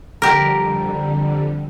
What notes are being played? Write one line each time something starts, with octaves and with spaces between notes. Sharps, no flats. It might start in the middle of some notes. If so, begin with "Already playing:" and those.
F2 D3 G3 G4 A#4 A#5